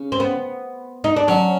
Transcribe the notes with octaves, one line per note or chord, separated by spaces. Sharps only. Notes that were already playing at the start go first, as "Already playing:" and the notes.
Already playing: C#3
C4
B3
D#4
D4
F#3 C#4